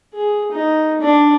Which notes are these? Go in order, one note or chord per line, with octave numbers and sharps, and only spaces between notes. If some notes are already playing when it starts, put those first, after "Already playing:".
G#4
D#4
D4